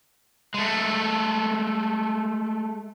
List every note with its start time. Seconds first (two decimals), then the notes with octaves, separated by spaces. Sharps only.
0.54 G#3 A3